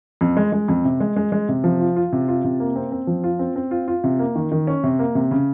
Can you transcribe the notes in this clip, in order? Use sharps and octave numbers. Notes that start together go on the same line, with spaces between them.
F2
G#3
G#3
F2
C3
G#3
G#3
G#3
C3
F3
F4
F4
C3
F4
C3
A#3
C4
C4
F3
F4
C4
C4
F4
F4
C3
A#3
D#3
D#3
C#4
C3
A#3
C3
C#3